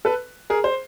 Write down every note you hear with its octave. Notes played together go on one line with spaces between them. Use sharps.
A4 B4
G#4 A#4
C5